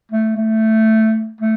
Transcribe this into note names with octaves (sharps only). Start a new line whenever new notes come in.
A3
A3
A3